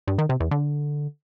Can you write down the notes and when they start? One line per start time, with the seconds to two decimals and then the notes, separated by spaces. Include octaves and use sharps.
0.08 G2
0.18 D#3
0.29 C3
0.40 E2
0.51 D3